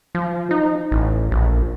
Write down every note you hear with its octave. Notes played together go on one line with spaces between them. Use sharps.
F3
D#4
A1
A#1